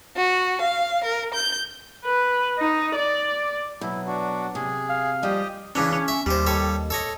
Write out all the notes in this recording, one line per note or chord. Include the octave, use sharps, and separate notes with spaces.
F#4
F5
A#4
G6
B4
D#4
D5
B2 F#3 E4
D4 F#4
C3 G#4
F5
F3 G3 G4 D#5
C#3 E3 C#4 D4
C#4
E5
D#2 G3 C5
G3 A4 C#5
A4 C#5 D#5